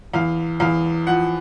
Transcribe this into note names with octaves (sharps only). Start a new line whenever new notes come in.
E2 F5
E2 F5
F3 F#5